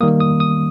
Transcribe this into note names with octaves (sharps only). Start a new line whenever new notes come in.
D#3 G3 A#3 D#6
D#6
D#6